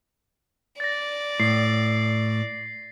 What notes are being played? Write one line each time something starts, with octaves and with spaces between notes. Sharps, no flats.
D5 A6 A#6
A2 C7